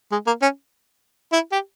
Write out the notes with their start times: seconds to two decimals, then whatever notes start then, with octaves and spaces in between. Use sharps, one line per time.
0.11 G#3
0.27 A#3
0.42 C#4
1.33 E4
1.52 G4